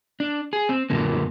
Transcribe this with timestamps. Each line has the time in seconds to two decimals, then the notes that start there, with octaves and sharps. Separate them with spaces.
0.20 D4
0.53 G#4
0.69 C4
0.90 F#2 A#2 D3 A#3